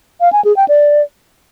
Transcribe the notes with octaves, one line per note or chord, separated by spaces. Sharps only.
F5
G#5
G#4
G5
D5